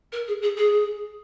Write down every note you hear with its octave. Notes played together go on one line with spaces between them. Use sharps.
A#4
G#4
G#4
G#4